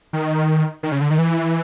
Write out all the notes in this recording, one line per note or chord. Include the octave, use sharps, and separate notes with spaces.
D#3
D#3
C#3
D3
D#3
E3